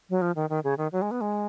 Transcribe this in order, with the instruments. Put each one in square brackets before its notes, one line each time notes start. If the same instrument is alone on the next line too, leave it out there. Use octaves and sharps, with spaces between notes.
[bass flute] F#3
F3
D#3
D#3
C#3
D#3
F#3
G#3
B3
G#3